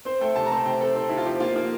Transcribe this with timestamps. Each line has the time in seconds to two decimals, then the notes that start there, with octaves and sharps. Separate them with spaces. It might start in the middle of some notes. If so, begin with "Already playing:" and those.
0.05 C4 C5
0.21 A3 G5
0.36 C3 A5
0.46 A#5
0.51 C4 A5
0.65 C3 G5
0.81 C4 A4
0.96 C4
1.09 C3 E4
1.18 F4
1.26 F3 G4
1.40 A#3 F4
1.56 A#3 F4